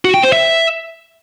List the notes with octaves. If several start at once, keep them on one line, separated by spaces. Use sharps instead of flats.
F#4
G5
C5
E5